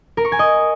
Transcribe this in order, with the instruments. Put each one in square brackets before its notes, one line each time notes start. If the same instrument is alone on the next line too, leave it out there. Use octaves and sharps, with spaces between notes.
[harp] A#4
C#6
G#5
D#5